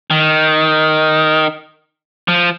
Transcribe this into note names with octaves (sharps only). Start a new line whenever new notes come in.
D#3
F3